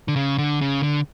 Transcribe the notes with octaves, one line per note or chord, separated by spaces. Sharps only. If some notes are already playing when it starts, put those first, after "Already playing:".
D3
C#3
D3
C#3
D3